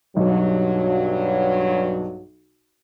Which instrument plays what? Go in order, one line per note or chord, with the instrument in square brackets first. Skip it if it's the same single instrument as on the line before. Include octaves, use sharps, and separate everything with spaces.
[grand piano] B1 [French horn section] G2 F#3